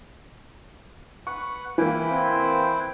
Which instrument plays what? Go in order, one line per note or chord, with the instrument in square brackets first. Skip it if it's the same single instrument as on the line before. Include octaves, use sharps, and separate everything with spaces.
[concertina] B4 F#5 [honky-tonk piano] C#6
[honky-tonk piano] E3 A#3 [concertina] E4 B4 G5
[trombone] C4